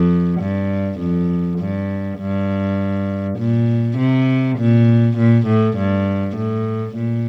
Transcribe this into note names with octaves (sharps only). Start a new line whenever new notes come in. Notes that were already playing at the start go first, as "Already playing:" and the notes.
Already playing: F2
G2
F2
G2
G2
A#2
C3
A#2
A#2
A2
G2
A2
A#2